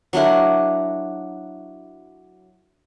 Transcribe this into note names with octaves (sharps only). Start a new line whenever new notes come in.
F#3 D4 E4 A#4